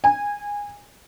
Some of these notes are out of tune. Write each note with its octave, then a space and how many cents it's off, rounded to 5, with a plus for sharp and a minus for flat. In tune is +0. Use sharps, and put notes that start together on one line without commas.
G#5 -20